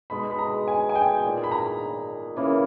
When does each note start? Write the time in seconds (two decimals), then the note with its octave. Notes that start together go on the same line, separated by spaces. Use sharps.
0.10 B2 G#3 D#4 B5
0.31 B5
0.39 A#5
0.68 G#5
0.89 G#5
0.95 G5
1.23 A#2 A#3 D#4 G#4
1.44 B5
1.51 A#5
2.36 C#3 E3 A#3